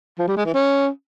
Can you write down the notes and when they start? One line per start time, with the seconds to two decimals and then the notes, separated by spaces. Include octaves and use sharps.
0.19 F3
0.28 G3
0.37 G#3
0.45 E3
0.54 C#4